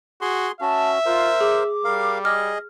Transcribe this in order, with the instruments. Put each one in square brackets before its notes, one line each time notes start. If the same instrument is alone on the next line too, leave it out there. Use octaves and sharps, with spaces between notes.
[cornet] F#4 [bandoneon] G#4 C6
[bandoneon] C#4 F#4 [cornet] E5 [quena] A5
[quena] F4 [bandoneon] A#4 C5
[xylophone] G#4 [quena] D6
[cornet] G3 [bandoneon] A#4 F5
[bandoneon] G#4 D#5 [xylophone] F6